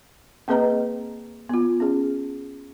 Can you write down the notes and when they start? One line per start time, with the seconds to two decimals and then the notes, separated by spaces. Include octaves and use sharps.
0.48 A#3 C4 G#4 B4 D#5 A#5
1.49 B3 F4
1.80 C#4 G#4